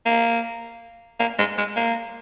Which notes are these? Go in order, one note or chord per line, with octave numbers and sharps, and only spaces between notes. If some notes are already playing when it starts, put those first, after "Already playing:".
A#3
A#3
G#3
G#3
A#3